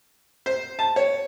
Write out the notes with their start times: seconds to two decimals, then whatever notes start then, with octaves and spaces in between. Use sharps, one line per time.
0.46 C5
0.79 A5
0.96 C#5